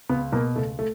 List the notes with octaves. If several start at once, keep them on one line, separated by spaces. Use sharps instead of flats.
C#2 B3
B2 A#3
C#2 A3
A3